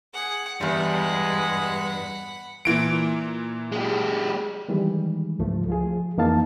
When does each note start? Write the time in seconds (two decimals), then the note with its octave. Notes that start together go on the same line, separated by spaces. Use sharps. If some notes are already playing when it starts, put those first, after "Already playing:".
0.14 G#4 F#5
0.61 E2 G2 G3 G#3 F#5 B5
2.65 A#2 E3 D7
3.72 G#3 G4
4.69 D#3 E3 G3 G#3
5.39 C#2 G#2 F3 A3
5.68 F3 F4 G#4
6.17 F2 E3 A#3 D#4 F5 A5